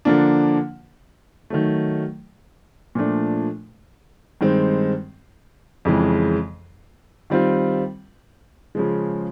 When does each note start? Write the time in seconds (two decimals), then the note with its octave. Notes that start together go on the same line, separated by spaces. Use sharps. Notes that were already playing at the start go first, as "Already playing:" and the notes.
0.05 D3 F3 A#3 D4
1.50 D#3 F#3 A3
2.95 A#2 F3 A3 D4
4.41 G2 D#3 G#3 C4
5.85 F2 C#3 E3 G#3
7.30 D#3 G3 C4 F4
8.75 C#3 F3 G#3